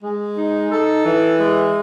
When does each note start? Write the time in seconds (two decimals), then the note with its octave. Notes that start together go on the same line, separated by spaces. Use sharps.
0.03 G#3
0.37 D#4
0.72 A4
1.05 E3
1.40 G#3